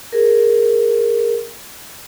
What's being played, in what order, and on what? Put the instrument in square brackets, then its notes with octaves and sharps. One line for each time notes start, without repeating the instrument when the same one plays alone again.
[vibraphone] G#4 A#4